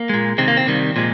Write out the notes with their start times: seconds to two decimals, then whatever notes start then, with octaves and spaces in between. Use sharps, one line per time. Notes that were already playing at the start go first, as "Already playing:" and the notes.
Already playing: A#3
0.09 A#2 G#3
0.38 C3 D#3 G#3 C4
0.48 A#3
0.57 C4
0.67 C3 D#3 G3
0.96 A#2 F3 G#3